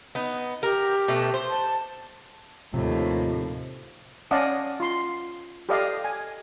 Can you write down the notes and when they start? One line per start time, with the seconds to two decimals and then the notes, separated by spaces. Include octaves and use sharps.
0.15 B3 D#4
0.63 G4 A#4
1.08 B2 A3
1.34 C5
1.50 A5
2.74 D#2 A2 C3 F3
4.31 C#4 D5 D#5 F5 F#5 A5
4.80 F4 C6
5.69 G4 A4 D5 D#5 F5
6.04 G#5